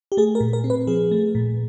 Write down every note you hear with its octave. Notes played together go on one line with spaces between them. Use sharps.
G4
A3 G#4
A#4
A#2
A#4
C4
B4
F3 G#4
A3
A#2